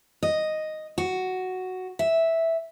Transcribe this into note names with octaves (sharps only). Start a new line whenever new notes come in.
D#5
F#4
E5